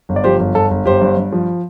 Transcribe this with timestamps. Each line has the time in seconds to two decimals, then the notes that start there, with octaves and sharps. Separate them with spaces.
0.09 G1
0.16 D5
0.24 F3 G4 C5
0.40 G1
0.55 G1 A4
0.71 G1
0.86 G1 G4 C5
1.02 G2
1.17 G2
1.32 F3